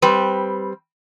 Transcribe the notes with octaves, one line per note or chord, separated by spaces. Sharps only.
G3 C4 B4